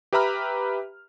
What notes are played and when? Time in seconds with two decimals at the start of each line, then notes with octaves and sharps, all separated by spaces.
0.13 G4 B4 E5 A#5 B5 F6